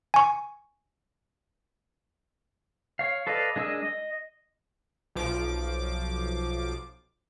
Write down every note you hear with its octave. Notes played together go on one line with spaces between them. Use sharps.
G#5 C#6
C#5 F5
A4 B4 D5 D#5 F5
G#3 D4 A#4 D#5 E6
D#5
B1 F3 D6